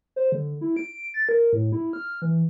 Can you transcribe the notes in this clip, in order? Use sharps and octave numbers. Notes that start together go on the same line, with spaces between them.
C5
D3
E4
D7
A6
A#4
A2
E4
F6
E3